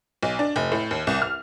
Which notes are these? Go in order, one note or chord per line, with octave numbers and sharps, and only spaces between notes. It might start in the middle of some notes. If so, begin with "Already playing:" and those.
B1
D4
F1
A2
D#2
C2
F6